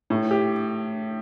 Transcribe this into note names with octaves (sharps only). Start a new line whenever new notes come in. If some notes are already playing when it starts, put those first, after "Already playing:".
A2
G4